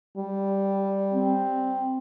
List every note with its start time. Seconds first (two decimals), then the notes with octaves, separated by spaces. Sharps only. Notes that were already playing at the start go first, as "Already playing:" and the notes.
0.17 G3
1.13 C4